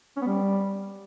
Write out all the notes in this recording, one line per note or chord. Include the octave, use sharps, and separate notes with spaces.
C#4
B3
G3